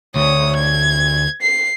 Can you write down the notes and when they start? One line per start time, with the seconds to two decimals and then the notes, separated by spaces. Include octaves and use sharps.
0.16 D2 C#5 D#6
0.56 G#6
1.42 C7